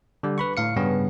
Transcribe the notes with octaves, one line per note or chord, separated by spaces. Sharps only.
D3 G3
B4 B5 C#6
A2 F5 C#7
G2 C#3 B3 C#4